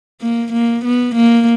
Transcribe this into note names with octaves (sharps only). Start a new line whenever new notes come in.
A#3
A#3
B3
A#3